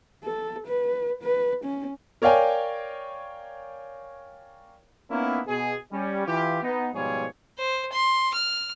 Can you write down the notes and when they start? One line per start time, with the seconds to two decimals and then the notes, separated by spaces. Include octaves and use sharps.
0.24 A4
0.67 B4
1.22 B4
1.64 C#4
2.22 A#4 C#5 D5 F5 G5 G#5
5.10 A#3 B3 C#4 D#4 E4
5.47 B2 G#4
5.92 G3 C#4
6.27 E3 F4 G4
6.63 B3 D#4
6.94 G#2 B2 F3 G3 G#4 C#5
7.58 C5
7.92 C6
8.34 F6